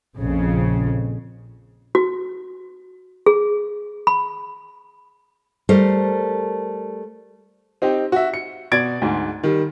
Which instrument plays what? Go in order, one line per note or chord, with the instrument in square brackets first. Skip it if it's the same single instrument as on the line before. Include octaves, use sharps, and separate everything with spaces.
[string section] A#1 F2 C#3
[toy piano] F#4
G#4
B5
[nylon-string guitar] G3 A3 A#4 C5
[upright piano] C4 D#4 G4
F#4 E5
C#7
B2 D5 G#6 A6 D7
D2 G#2
D#3 G3